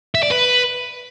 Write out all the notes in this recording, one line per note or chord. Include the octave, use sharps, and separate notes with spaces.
E5
D5
B4